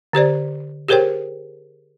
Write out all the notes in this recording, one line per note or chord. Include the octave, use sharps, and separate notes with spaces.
D3 G4 C5 D5
G4 G#4 A#4 C5 C#5 G5